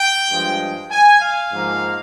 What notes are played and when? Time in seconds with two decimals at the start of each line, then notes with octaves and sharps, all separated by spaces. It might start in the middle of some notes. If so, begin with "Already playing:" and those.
Already playing: G5
0.30 G2 F3 G#3
0.91 G#5
1.21 F5
1.51 G#2 F3 A#3